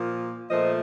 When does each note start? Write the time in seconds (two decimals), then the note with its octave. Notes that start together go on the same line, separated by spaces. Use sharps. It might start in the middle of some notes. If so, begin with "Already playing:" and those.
Already playing: A#2 F3 A#3
0.50 A#2 F3 A3 C5 D#5